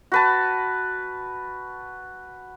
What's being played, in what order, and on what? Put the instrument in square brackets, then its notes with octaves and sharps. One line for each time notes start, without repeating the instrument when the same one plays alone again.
[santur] F#4 B4 A5